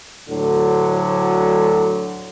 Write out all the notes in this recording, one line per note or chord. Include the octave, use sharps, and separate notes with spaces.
D2 A2 D3 F#3